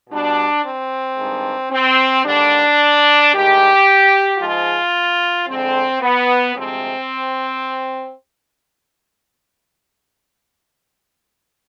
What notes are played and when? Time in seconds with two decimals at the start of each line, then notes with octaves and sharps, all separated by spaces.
0.10 B2 G3 D4
0.64 C4
1.17 G2 D#3 G#3
1.71 C4
2.25 D#2 D3 G3 D4
3.33 G2 D#3 G#3 G4
4.39 G#2 F3 G#3 F4
5.47 F2 D3 G#3 C4
6.01 B3
6.55 D2 C3 F3 G#3 C4